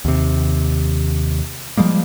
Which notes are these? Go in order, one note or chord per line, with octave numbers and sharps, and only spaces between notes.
D#2 C3
F3 G3 G#3 A#3